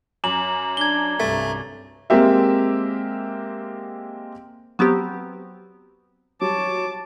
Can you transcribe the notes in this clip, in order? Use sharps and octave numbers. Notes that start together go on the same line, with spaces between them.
F#2 D6 E7 F#7
D4 G#6 G7
C2 G2 A3
G#3 A#3 C4 G4 A#4 E5
F#3 B3 C4 G4
F#3 G3 C#5 A5 D6